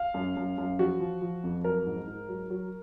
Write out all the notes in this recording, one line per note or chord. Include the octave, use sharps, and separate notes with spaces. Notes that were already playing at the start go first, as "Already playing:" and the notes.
Already playing: F5
F#2
F#2
F#2
F3 F#4
F3
F3
F2
F#3 A#4
G#2
G#2
F#3
F#3